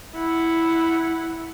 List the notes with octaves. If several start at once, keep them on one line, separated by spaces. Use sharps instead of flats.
E4 F#5